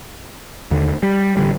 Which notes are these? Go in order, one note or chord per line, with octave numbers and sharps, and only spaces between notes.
D#2 D3
G3
A1 D3 G3